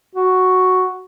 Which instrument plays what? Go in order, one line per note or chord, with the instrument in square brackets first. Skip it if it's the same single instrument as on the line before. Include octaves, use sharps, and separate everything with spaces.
[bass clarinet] F#4